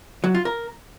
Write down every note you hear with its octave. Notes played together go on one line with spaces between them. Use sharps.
F#3
F4
A#4